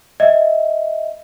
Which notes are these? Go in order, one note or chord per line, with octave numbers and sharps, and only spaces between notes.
D#5 E5